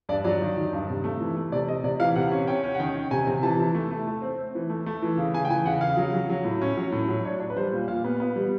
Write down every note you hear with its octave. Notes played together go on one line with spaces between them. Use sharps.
G2 D5
F#3 D5
D#3
D#3
G2
C3
A3
E3
A3
C3 D5
C3 D#5
C3 D5
E3 F5
C3 F#5
C#4
C#4 G5
C#4
F#5
D#3 G5
D#3
C3 G#5
C3
E3 A5
E3
A3
A3
A3
C4
C4
E3
A3
A3
E3
C#3
C#3 G#5
G5
E3 G#5
C#3 F#5
C#3 F5
F#3
F#3
F#3
A2
C#4
F#3
A2
F#3
D4 C#5
D4
B4
G3 C5
A#2
A#2 F5
B3
B3
G3